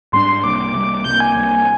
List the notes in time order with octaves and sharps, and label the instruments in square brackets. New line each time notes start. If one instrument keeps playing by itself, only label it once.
[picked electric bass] G#2 G3 A#3 D4 [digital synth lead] C6
[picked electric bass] C2 C3 G3 A#3 [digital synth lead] D6
[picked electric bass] C2 C3 G3 A#3
[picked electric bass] C2 C3 G3 A#3 [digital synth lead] G6
[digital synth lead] G#5
[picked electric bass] C2 C3 G3 A#3